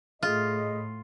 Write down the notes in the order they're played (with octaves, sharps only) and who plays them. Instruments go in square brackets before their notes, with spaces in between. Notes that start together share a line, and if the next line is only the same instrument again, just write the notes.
[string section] A2 [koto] F4 [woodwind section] G#4 D#5